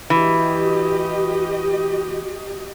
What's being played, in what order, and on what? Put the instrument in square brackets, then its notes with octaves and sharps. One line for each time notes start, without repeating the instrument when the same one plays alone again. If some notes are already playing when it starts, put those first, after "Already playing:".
[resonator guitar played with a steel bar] E3 [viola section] F#4 G4 D#5